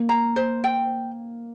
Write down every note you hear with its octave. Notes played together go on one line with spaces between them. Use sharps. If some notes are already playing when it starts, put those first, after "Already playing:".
Already playing: A#3
A#5
C5
G5